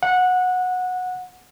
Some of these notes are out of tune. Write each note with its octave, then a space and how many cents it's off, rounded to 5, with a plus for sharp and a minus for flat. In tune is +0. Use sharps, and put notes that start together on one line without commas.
F#5 -15